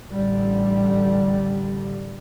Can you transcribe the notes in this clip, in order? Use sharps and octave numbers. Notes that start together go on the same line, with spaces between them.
A1 D3 G3